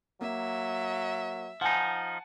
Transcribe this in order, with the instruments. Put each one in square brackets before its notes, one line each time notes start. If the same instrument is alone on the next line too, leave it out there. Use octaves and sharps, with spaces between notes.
[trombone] F#3 [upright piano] A#3 [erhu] E5
[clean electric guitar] F3 D#4 [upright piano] F#5 G#5 A5